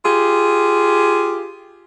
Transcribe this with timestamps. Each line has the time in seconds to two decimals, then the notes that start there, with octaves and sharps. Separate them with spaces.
0.04 F4 G4 G#4